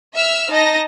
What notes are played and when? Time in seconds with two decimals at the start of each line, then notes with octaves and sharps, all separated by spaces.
0.14 E5 E6 F6
0.51 D#4 D#5 A5 A#6